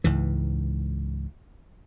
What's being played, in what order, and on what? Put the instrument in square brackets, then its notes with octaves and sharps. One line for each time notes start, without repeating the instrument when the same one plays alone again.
[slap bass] C#2 G#2 E3